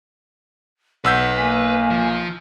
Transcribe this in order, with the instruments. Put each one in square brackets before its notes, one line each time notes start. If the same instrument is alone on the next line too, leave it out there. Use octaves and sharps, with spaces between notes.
[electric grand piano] B1 E6 G6 [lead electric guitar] B4 [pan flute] F#5
[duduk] A#3 [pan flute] G#5
[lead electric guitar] F3